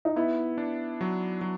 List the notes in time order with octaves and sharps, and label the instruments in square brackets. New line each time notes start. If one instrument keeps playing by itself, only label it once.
[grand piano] D#4
[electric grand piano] B3 [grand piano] E4
[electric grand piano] D4
F#3
F#3